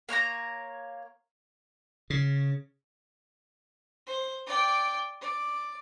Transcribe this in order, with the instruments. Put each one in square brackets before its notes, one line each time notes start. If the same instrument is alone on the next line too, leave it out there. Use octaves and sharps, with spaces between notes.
[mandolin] A#3 C#5 F#5 A#5
[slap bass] C#3
[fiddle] C5
D5 G5
D5